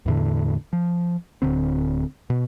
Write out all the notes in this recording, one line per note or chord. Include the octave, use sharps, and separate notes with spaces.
E2 A2 D3
F3
D1 D3 C4
B2